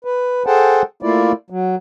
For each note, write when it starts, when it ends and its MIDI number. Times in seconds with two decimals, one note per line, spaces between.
0.05 0.43 71
0.47 0.82 68
0.47 0.82 69
0.47 0.82 72
0.47 0.82 78
0.47 0.82 79
0.47 0.82 81
1.03 1.32 57
1.03 1.32 58
1.03 1.32 64
1.03 1.32 65
1.03 1.32 74
1.50 1.75 54